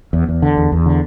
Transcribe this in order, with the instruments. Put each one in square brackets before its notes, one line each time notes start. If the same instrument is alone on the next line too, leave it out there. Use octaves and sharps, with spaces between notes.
[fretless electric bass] E2
E2
D3
E2
E2
D3